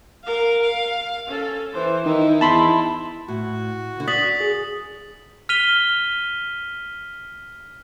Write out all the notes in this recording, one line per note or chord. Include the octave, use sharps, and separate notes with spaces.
A#4 F5
F5
C#4 A4
E3 C5
D#3 D#4 E4
E2 A5 B5 C6
A2 F#4
D2 D3
D5 D#6 A6 B6 F#7
G#4
F6 B6 D#7 F7 G7